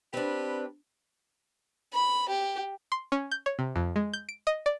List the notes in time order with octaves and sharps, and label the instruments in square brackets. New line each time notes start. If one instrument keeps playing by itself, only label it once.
[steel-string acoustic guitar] C4 D4 [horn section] G4 B4
[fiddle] B5
G4
[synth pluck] C6
C#4
G6
C#5
C3
F2
G#3
G6
D7
D#5
D5